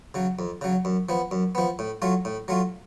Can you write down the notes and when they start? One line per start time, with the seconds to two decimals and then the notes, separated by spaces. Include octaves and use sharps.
0.14 C#3 F#3
0.39 F2
0.61 C#3 F#3
0.85 F#2
1.09 F3 B3
1.31 F#2
1.55 F3 B3
1.79 A2
2.02 F#3 A3 F4
2.25 A2
2.48 F#3 A3 F4